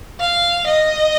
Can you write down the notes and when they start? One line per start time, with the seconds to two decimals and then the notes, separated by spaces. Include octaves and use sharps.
0.21 F5
0.67 D#5